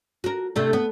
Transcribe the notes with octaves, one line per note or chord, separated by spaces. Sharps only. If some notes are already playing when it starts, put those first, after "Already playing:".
F#4 A#4
C3 A3 D4
B3